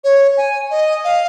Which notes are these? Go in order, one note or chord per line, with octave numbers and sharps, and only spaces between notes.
C#5
G#5
D#5
F5